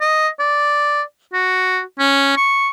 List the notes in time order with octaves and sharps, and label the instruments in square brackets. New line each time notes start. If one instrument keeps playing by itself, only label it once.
[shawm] D#5
D5
F#4
C#4
C#6